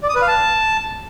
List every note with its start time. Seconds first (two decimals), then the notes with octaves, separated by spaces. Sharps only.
0.03 D5
0.09 D#6
0.15 B4
0.22 F5
0.28 A5